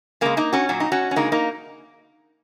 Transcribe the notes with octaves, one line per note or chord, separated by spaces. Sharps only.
C#3 G#3 A#3
A#3 D#4
C#4 F#4
A#2 F#3 F#4
D#4
C#4 F#4
C#4
C#3 G#3 A#3 D#4
A#3 D#4